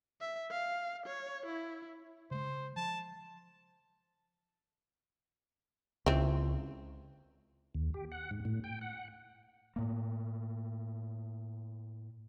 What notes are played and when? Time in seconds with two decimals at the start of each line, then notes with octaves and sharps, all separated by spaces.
0.21 E5
0.51 F5
1.06 C#5
1.46 E4
2.31 C#3 G#3 C5
2.76 F3 A5
6.06 C#2 E3 C4
7.74 D#2
7.94 G4
8.12 F#5
8.31 G#2
8.45 A2
8.64 G5
8.81 F#5
9.76 A2 A#3